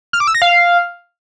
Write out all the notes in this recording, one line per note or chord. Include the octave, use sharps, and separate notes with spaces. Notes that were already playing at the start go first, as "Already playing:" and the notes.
F6
D6
E6
A#6
F5